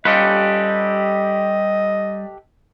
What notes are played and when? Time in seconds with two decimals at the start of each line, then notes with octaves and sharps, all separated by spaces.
0.05 G3 C#4 F4 G4 A4 B4 D#5